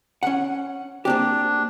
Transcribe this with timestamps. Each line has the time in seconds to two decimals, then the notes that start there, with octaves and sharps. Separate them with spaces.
0.23 C#4 F#5
1.05 A#3 C4 D4 G4